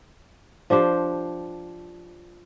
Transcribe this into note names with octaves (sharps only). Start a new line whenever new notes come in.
F3 D4 G4 C5